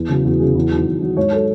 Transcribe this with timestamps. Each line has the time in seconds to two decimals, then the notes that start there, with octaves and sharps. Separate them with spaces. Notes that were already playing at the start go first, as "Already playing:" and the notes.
Already playing: E2 G#4
0.09 C#3 F#3
0.25 E2 F#4
0.40 C#3 F#3 G#4
0.55 E2
0.71 D#3 F#3
0.86 E2
1.02 D#3 F#3
1.17 G#2 C#5
1.32 F#3 A4